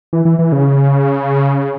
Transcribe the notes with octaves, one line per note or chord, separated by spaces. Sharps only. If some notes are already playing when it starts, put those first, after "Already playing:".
E3
E3
E3
C#3